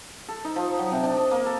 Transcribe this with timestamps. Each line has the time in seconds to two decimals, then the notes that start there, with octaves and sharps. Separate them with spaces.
0.29 A4
0.45 D#4
0.56 F3
0.79 F#3
0.92 C3
1.03 D4
1.17 D#5
1.31 A#3
1.46 A4